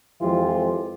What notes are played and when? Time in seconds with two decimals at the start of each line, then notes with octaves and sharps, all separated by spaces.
0.21 F2 E3 F3 G#3 F4 G4